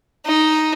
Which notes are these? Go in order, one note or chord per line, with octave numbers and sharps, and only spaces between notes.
D#4